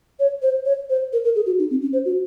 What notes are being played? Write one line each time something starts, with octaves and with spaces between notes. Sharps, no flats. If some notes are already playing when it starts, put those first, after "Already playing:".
C#5
C5
C#5
C5
A#4
A#4
G#4
F#4
D#4
C4
C#4
C5
F#4